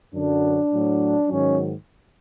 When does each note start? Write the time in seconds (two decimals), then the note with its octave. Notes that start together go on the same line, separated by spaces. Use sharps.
0.14 F#2 D3 F#3 D4
0.71 A2 F#3
1.27 G#2 D#3 F#3 C#4